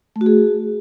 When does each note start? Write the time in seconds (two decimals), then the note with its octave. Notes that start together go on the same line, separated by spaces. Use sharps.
0.16 A3
0.21 F#4
0.26 G#4